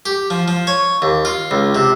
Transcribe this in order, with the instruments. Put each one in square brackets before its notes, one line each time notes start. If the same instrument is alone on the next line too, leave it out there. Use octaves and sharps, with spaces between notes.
[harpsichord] G4
F3
F3
C#5
D#2
F4
C#2
C3